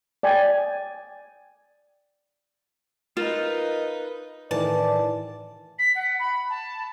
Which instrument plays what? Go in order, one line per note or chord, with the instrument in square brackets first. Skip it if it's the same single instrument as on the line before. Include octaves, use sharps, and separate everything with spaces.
[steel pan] D5 G5 G#5
[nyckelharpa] D#4 B4 [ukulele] F4 [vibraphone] A#4 D#5
[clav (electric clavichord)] A2 D#3 E3 [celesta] B4 [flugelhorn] D5 [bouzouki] A5
[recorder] B6
F#5
B5
A5